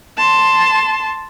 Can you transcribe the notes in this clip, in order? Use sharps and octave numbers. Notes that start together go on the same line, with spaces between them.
A5 C6